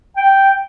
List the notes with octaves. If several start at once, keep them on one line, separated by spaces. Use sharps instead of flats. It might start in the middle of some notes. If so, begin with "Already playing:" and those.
G5